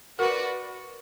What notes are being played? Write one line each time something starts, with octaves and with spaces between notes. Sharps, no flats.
F#4 A#4 B4 D5